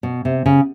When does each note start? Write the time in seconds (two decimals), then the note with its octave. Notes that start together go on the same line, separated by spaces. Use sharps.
0.03 B2
0.25 C3
0.46 C#3